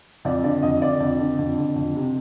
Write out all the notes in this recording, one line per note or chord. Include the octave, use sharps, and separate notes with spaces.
F2 D5
D3 D5
F2 D#5
D3 D5
F2
D3
F2
D3
F2
C3